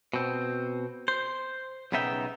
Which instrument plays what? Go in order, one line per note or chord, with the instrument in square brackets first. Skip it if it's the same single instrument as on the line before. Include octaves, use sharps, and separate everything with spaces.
[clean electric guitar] B2 C4
C5
B1 C#3 B3 D#4 E5 G5